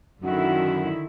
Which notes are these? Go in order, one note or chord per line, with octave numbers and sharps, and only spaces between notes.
F#2 D3 D#3 E4 F#4